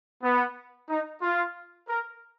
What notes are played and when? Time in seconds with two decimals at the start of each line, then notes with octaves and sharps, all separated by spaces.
0.23 B3
0.90 D#4
1.22 F4
1.89 A#4